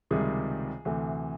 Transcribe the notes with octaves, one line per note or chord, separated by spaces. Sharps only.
C#2 C3 D#3 G3 G#4
D2 C3 E3 A3